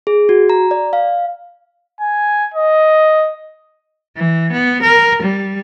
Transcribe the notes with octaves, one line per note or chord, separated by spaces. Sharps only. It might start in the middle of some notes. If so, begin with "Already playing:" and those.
G#4
F#4
A#5
D5
F5
G#5
D#5
E3
B3
A#4
G3